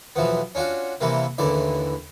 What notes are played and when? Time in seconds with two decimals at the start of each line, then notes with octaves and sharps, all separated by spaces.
0.16 B1 E3 F3 B3
0.55 C#4 D4 F4 F#4
1.01 C3 E3 G3 A#3
1.38 A1 D#2 D3 E3 D5